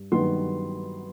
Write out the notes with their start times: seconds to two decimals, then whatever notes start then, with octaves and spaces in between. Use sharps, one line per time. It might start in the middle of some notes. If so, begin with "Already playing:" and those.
Already playing: G2
0.12 G2 D#3 F#3 B3 C6